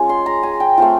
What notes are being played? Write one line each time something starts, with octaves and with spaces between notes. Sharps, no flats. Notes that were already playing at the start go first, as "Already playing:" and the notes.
Already playing: G#3 C#4 F4
C6
A#5
G#5
G5
A3 C4 F4